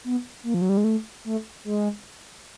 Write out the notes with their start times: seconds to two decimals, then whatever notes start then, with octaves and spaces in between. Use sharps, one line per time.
0.04 B3
0.44 A#3
0.54 F3
0.62 F#3
0.69 G3
0.77 G#3
0.84 A3
1.25 A3
1.64 G#3